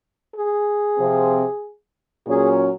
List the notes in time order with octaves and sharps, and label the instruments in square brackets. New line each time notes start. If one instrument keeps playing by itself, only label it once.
[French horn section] G#4
C3 F3 C4
A#2 F#3 C#4 G#4